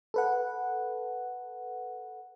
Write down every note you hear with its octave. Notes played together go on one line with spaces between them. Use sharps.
A4 B4 F#5